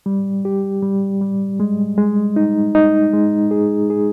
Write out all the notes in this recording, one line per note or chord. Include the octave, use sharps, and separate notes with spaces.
G3
G4
G3
G3
G#3
G#3
D#4
D#4
G#3
G#4
G#4